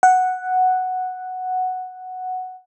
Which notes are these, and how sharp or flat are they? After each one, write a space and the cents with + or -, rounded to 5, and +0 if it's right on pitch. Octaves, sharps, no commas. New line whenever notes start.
F#5 +0